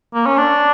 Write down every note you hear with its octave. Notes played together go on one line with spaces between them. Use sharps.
A#3
C#4
D4